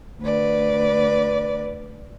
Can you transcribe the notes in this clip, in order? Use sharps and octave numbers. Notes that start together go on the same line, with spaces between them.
D2 B4 D5